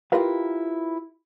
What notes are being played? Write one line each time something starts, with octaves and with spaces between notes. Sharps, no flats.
E4 F4 G4 A#4 B4 F5